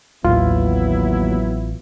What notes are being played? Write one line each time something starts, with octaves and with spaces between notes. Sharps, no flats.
A1 D#2 F#3 B3 E4 F4